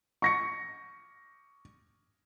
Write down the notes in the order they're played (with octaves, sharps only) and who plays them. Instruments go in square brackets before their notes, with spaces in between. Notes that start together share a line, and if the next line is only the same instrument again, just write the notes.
[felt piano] C#6 A#6 C#7